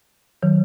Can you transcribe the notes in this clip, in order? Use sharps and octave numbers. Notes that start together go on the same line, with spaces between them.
D#3 F#3